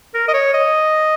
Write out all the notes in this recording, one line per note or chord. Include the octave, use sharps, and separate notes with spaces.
A#4
D#5
C#5
D#5